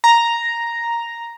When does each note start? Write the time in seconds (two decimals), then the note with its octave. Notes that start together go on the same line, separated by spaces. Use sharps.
0.04 A#5